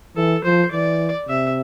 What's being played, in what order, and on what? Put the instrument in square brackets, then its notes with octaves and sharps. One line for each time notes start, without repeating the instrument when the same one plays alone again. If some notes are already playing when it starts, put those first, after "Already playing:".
[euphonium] E3 [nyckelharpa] A4
[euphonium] F3 [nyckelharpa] C5
[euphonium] E3 [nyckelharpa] D5
[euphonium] C3 [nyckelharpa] E5